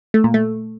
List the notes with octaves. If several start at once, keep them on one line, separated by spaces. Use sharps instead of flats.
A3
A#2
A3